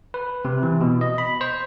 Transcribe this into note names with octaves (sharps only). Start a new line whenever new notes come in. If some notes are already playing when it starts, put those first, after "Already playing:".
B4
C3
E3
B2
D#5
B5
C5